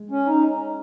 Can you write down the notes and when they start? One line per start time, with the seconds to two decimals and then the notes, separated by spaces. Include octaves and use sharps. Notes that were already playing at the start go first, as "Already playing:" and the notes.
Already playing: G#3
0.10 C#4
0.26 D#4